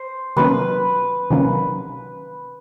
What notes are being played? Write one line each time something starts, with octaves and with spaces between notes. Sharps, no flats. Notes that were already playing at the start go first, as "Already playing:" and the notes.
Already playing: C5
C3 D#3 F#3 A#3 C#4 B4
C3 D#3 F#3 A#3 C#4